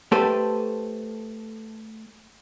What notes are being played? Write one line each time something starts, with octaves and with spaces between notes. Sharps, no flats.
A3 G4 A4 B4 C5